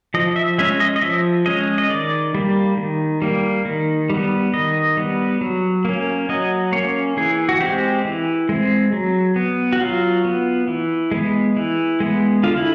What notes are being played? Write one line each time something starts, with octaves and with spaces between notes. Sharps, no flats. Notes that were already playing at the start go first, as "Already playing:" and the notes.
F3 D#5
E5
G#3 C#4 E5
D#5
D#5
F3 E5
G#3 C#4 D#5
D#5
D#3 D5
G3 A#3
D#3
G3 A#3
D#3
G3 B3
D#3 D#5
G3 B3
F#3
A#3 C#4
F#3 D#5
A#3 C#4 C#5
E3 G#4
F#4
G#3 C4 G4
E3
G#3 C4
F#3
B3
F#4
F#3 F4
B3
E3
G#3 B3
E3
G#3 B3
D3 F4
E4